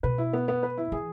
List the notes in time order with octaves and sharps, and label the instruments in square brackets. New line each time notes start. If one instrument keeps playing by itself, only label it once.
[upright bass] B2 [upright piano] B4
[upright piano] E4
B3
B3
B4
E4
[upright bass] E3 [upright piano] G#4